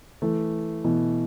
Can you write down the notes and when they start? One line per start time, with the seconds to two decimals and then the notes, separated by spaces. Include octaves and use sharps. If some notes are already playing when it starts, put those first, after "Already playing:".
0.22 E3 A3
0.84 B2 E3